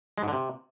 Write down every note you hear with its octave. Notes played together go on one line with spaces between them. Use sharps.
G#3
G#2
D3
C3